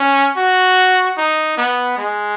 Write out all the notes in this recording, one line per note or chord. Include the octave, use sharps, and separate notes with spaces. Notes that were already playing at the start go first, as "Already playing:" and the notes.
Already playing: C#4
F#4
D#4
B3
G#3